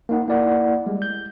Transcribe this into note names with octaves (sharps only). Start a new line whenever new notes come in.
A#3 D#4 F#5
A#3 E4 D5 F#5
G3 G#3
G6